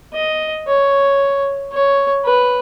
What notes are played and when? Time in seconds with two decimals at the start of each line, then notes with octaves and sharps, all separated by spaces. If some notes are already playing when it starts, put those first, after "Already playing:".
0.14 D#5
0.67 C#5
1.72 C#5
2.25 B4